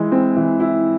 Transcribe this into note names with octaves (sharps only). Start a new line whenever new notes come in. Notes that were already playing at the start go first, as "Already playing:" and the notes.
Already playing: E3 G#3 E4
C4
E3
E4